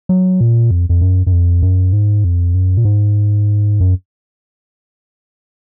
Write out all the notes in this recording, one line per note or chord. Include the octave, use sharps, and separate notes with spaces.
F#3
A#2
F2
F2
F#2
F#2
F2
F#2
G#2
F2
F#2
A#2
G#2
F#2